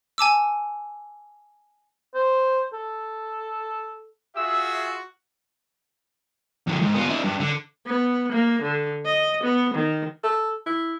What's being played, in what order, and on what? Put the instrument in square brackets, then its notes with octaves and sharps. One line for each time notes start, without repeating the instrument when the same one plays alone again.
[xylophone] G#5 A5 D6 E6
[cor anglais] C5
A4
[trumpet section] F4 G#4 E5 [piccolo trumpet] F#4 [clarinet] E6
[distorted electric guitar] F2 D3
G#2
B3 F4
D4 E4
G2
D3
[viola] B3
A#3
D3
D#5
B3
D#3
[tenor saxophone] A4
E4